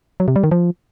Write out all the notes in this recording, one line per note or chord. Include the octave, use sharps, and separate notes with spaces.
F#3
C3
G3
D#3
F3